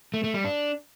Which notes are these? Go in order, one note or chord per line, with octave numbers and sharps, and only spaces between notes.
A3
A3
G3
D4